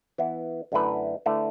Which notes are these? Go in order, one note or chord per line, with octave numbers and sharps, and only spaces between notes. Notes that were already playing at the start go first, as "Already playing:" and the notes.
E3 B3 E4
F#2 D3 A3 E4 B4
D3 A3 E4 B4